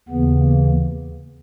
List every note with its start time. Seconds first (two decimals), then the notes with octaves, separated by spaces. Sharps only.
0.09 D#2 C#3 E3 B3
0.40 A#3